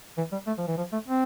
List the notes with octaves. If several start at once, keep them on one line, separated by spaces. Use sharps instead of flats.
E3
G3
A3
F3
E3
F3
A3
C4